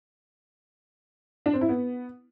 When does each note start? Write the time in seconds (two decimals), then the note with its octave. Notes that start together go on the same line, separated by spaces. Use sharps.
1.46 D4
1.54 C4
1.61 E4
1.69 B3